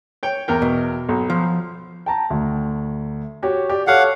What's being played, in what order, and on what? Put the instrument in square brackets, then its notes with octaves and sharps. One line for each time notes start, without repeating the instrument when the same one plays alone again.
[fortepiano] C#5 G5
E2 A#4 G5
[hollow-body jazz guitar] B2
[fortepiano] B1
[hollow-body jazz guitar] F3
[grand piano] G5 A5 A#5
D2
F#4 G4 C#5
G4 D5
[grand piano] G4 A4 C#5 [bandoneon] F5 F#5